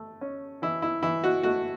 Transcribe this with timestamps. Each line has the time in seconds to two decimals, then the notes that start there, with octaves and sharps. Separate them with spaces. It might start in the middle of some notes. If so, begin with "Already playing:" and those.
Already playing: A3
0.21 C#4
0.62 E3 E4
0.82 E4
1.03 E3 E4
1.24 F#4
1.43 A3 F#4